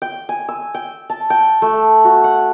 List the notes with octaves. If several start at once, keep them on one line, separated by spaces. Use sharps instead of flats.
G5
G#5
E6
G5
A5
G5
A3
F#4
F#5